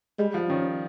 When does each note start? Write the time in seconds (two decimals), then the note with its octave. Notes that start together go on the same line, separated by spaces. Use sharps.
0.19 G3 G#3
0.34 F3
0.49 D#3 C#4